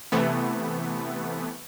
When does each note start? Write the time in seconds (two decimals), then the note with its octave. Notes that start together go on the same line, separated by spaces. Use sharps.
0.12 C3 E3 A3 B3